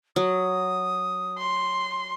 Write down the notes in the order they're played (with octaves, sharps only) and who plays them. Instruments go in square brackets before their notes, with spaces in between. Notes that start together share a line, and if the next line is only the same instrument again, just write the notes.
[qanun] F#3 [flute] D#6
[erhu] C6